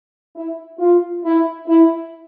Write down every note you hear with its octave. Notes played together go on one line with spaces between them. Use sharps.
E4
F4
E4
E4